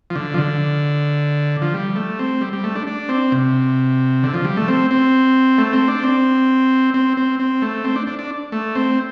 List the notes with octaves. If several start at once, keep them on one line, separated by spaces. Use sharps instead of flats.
F3
D3
F3
D3
F3
G3
A3
C4
G3
G3
A3
D4
D4
C4
C3
D3
F3
G3
A3
C4
C4
A3
C4
D4
C4
C4
C4
C4
A3
C4
D4
D4
D4
A3
C4